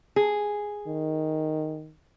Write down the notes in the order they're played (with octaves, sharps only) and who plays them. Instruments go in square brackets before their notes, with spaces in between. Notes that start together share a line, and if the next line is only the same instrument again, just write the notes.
[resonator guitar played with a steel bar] G#4
[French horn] D#3